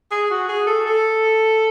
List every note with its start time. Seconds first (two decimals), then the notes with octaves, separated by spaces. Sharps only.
0.11 G#4
0.30 F#4
0.48 G#4
0.67 A4
0.86 A4